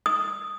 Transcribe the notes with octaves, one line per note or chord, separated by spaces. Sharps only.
D#6